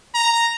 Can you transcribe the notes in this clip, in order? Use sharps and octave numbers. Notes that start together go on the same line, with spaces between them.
A#5